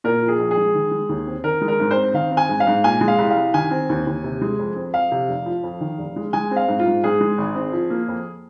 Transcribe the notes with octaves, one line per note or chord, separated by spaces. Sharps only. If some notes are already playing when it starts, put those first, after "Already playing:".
A#2 A#4
F3
G#4
A#1
G#4
G#3
D#3
G#3
D#2
C4
D#3 A#4
G#3
A#4
G#2
C5
C4
D#3 F5
C4
G#5
G#2
F5
G#2
A#2 G#5
G#3
F5
C2
F5
C2
D#3 G#5
C4
D#2
D#2
C3
G#3
F2
C4
F2 F5
C3
F1
F3
F2
D#3
F1
G#3
G#3 G#5
C4
F5
G#2
F4
G#2
G#2 G#4
G#3
G#1
C4
F3
A#3
F2